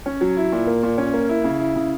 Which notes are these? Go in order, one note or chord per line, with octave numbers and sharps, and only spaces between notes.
C#4
F#3
E4
A#2
A#3
A#2
C#4
A#3
E4
C#3
E4
C#3